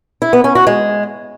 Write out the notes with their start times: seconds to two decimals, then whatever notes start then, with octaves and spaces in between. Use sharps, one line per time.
0.22 E4
0.33 B3
0.44 C#4
0.55 F#4
0.67 G#3